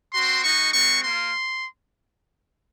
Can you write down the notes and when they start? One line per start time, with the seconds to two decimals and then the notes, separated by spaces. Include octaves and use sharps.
0.14 C4 F#4 C6
0.44 G#3 D#4 F#4 C#6
0.73 G#3 C4 F#4 C#6
1.03 A#3 F4 C6